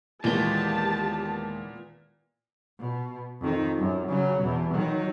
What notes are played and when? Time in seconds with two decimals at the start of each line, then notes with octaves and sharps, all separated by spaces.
0.24 D#2 A#2 E3 G#3 B3 G4 A5
2.80 B2
3.40 F2 D#3
3.78 F#2
4.08 C#3 F#3
4.40 E2 B2
4.73 D#3 F#3